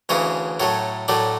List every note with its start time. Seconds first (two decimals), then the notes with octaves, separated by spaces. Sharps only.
0.09 D2 C#3 E3 C#5
0.60 A2 F#3 A3 C#5
1.08 A2 F#3 A3 D5